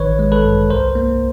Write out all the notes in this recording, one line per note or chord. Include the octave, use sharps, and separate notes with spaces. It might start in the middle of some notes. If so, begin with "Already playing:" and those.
Already playing: A1 D#3 B4 C#5
G#3
A4 B4
G2
C2 A#4 C5
A#3